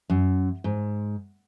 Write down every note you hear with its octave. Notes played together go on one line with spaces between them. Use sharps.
F#2
G#2